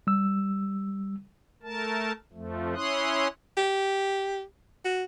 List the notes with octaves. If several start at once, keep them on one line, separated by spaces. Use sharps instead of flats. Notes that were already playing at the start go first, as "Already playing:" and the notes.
G3 E6
A3 A#4 A5
F2 F3 A3
C#4 E4 C#5 C6 D#6 F#6
G4
F#4